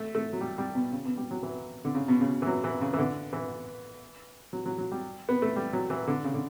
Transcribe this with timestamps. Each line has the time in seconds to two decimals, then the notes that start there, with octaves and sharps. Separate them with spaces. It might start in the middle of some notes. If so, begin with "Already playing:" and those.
Already playing: A3
0.15 A3
0.33 F#3
0.41 G3
0.58 G3
0.75 B2
0.92 C#3
1.05 B2
1.17 G3
1.31 F#3
1.43 E3
1.85 D3
1.95 C#3
2.08 B2
2.21 C#3
2.42 E3
2.47 F#3
2.64 E3
2.81 C#3
2.93 E3
2.98 D3
3.33 E3
4.53 F#3
4.66 F#3
4.78 F#3
4.92 G3
5.29 B3
5.42 A3
5.56 G3
5.73 F#3
5.90 E3
6.08 D3
6.24 C#3
6.34 D3